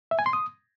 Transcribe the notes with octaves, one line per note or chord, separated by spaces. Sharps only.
E5
G#5
C6
D#6